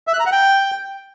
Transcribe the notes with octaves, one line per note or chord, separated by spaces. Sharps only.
E5
F#6
A#5
F#5
G5